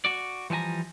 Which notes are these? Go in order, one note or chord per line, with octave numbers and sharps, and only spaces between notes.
F#4 D5
E3 F3 G3 G#5 A#5